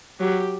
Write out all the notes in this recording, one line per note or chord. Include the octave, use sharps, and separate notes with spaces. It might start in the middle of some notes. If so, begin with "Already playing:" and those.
F#3 G4